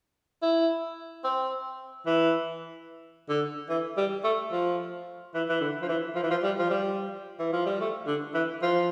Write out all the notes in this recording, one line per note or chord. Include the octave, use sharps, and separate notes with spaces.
E4
C4
E3
D3
E3
G3
A3
F3
E3
E3
D3
F3
E3
F3
E3
F3
G3
F3
G3
E3
F3
G3
A3
D3
E3
F3